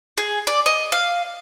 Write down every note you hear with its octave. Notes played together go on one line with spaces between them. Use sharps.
G#4
D5
D#5
F5